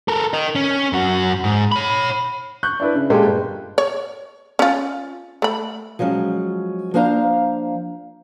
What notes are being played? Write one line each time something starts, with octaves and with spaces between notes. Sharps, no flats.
A4 A#4
A#4 D#5
C#4
F#2 F#4
G#2
C#5 B5
C#6 F#6 G6
D4 E4 B4
C#3
A#2 G#3 G4 A4
G1
C#5
C#4 F4
A3 B5
F3 F#3 G#3 C#4
F3 A#3 D4 C5 F5 A#5